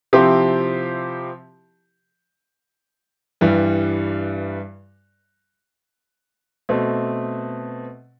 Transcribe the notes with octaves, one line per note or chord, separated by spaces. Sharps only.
C3 F3 C4 E4 G4
G2 E3 G3
B2 A3 C4